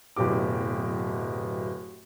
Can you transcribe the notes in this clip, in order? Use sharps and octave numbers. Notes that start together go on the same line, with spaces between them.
D1 F#2 B2 G4 D6